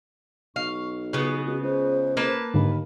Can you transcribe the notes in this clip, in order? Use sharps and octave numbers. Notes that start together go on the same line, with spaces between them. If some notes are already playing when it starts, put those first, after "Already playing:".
B1 F5 C#6
C#3 B3 F4
C#2 F#4
C#2 C5
A#3 B4 A5
D#2 G#2 D3 B5